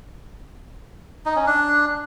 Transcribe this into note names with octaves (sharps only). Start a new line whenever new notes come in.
D#4
C#4
D4